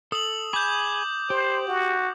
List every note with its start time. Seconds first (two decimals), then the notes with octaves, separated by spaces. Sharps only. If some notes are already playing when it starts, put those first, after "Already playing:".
0.12 A4 D#6 F#7
0.53 G#4 B5 D6 G6
1.30 G4 C5
1.67 F#4